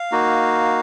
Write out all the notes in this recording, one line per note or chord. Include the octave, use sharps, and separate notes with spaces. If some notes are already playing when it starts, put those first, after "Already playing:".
Already playing: F5
A#3 D#4 F#4